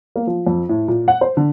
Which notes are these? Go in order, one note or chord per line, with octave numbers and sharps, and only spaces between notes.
A#3
F3
F2
A2
A#2
F#5
C5
D3